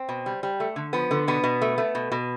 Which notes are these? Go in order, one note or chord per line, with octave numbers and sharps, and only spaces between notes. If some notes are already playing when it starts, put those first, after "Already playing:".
Already playing: C4
B2
G3
G3
A3
D3
F3 B3
D3
B2 B3
B2
A3
A3
B2
B2